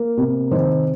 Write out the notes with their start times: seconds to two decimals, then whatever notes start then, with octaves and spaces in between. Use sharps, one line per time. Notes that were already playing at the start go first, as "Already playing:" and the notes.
Already playing: A#3 A#4
0.17 C3
0.51 D#3 C5